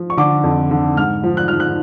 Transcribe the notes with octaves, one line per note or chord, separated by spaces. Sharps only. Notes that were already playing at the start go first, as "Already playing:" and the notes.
Already playing: F3
C#6
D3 D6
F2
D3
G#2 F6
F3
F#6
F3 F6
F#6